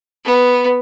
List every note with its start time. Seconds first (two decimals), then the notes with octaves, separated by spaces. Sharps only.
0.25 B3